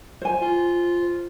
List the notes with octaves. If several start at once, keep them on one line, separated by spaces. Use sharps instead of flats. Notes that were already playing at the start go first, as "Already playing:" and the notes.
C5 G#5
F4